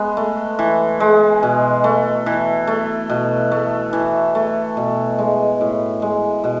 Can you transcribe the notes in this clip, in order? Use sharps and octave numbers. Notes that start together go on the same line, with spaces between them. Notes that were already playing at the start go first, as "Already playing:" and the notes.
Already playing: G#3 B3
A3
E3
G#3
B2
A3
E3
A3
B2
A3
E3
A3
B2
G#3
A2
G#3
B2